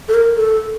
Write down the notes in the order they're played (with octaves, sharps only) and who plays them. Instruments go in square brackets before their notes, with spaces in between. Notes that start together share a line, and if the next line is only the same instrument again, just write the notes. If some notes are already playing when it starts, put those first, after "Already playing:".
[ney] A4
A#4
A4